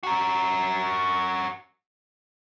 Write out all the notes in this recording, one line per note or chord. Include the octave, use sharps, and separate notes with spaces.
F#4 A#4